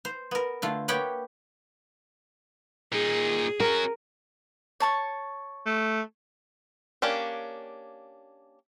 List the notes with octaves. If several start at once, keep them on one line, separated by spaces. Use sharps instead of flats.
C5
B3 A#4
D3 A3 F4
A#3 B3 G4 C#5 F#5 G5
A#2 D#4 G#4
C#4 F#4 A#4
C#5 A5 C#6
A3
A#3 C#4 D4 G4